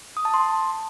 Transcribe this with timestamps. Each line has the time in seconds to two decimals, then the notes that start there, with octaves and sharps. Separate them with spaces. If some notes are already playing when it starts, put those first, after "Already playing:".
0.17 D#6
0.25 A5
0.34 C6